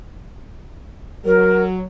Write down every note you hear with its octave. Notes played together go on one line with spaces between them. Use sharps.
F#3 A#4